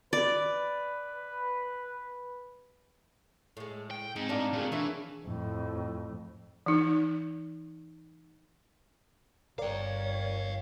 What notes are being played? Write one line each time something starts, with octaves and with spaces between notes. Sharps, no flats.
B4 D5
A2 G#3
G5
G#2 G#3 C4 D#4
E2 A2 D4 F5 A#5 D6
A3 D#4 F4 G#4 A#4
B2 E3 C#4 D4 E5
F2 A2
E3 D#4
G1 A#4 C#5 D5 F5 G5